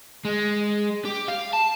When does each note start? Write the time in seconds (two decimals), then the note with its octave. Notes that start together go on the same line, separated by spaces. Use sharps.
0.25 G#3
1.05 G4
1.28 F5
1.53 A5